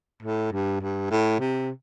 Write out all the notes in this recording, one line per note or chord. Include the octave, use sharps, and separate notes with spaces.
A2
G2
G2
A2
C3